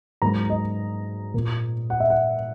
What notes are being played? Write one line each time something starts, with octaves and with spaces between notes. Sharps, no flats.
G#2 F#3 A#3 A#5
D#5
A#2 A#3
F#5
E5
F#5